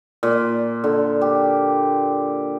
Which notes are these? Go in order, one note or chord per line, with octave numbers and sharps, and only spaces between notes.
A#2
D3
G4